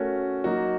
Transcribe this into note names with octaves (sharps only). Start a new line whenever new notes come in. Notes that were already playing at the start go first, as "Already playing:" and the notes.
Already playing: A3 C#4 F#4 A#4 C#5
F#3 A#3 D#4 F#4